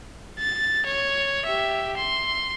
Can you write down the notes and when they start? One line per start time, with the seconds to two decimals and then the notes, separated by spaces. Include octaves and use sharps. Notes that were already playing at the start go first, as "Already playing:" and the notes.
0.39 A6
0.86 C#5
1.46 G4 E5
1.97 C6